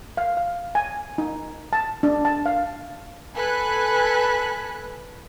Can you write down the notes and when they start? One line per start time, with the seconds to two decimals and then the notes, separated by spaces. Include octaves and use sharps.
0.17 F5
0.37 F5
0.75 G#5
1.18 D#4
1.73 A5
2.03 D4
2.25 A5
2.46 F5
3.35 A4 B4 G#5 B5 F#6